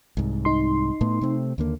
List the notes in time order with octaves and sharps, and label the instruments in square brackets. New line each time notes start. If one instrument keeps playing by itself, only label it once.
[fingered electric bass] C2 G#2
[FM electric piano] D#4 C6
[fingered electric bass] A2 A3 B3
C3 A3 C4
D#2 D3 A#3